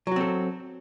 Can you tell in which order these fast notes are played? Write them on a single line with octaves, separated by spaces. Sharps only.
F#3 F#4 C4 A4